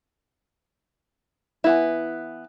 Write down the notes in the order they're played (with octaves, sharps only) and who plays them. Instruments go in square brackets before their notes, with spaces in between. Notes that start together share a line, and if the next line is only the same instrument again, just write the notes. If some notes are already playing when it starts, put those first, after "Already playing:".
[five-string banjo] E3 B3 E4